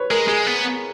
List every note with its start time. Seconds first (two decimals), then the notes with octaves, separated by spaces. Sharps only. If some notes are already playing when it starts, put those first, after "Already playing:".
Already playing: B4 C#5
0.10 G#3 A#4
0.28 G#3 G#4
0.47 B3